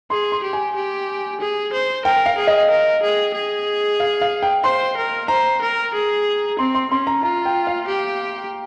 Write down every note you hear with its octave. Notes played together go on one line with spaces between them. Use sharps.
G#4 C6
C6
G4
G#5
G4
G#4
C5
A#4 G5
F5
G#4
D#5
A#4
G#4
G#4
F5
F5
G5
C5 C6
A#4
C5 A#5
A#4
G#4
C4 C6
C6
C#4 C6
A#5
F4 A#5
G5
F5
G4